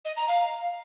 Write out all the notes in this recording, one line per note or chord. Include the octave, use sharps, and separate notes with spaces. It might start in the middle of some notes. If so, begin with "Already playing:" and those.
D#5
A#5
F5